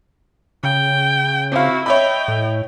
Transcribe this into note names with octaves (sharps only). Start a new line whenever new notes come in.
C#3 G5
C4 E4 F#4 F5
C#5 D#5 E5 G5 B5
A2